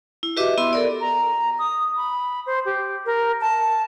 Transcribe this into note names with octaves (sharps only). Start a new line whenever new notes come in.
E4
F#4 G4 B4 D#5 E5 D6
B3 E4 E5 C6 E6
A4 A#4 D5
A#5
D#6
B5
C5
G4
A#4
A5